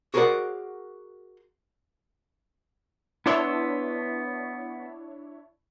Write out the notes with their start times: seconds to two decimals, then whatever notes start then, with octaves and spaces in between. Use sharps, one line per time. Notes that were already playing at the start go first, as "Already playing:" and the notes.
0.14 F#4 G#4 A#4 C5 D5 F#5
3.26 B3 D4 E4 C#5 C6 E6